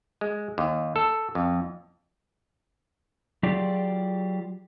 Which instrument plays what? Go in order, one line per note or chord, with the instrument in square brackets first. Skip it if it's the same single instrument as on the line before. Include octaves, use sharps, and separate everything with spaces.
[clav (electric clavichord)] G#3
D#2
A4
F2
[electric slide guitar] F#3 F4 G4 G#4 D5